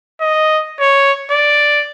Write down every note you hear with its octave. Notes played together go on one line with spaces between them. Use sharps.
D#5
C#5
D5